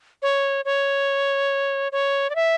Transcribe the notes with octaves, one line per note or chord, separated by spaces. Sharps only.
C#5
C#5
C#5
D5
E5